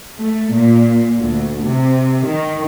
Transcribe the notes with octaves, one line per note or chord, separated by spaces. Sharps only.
A3
A#2
D2
C3
D#3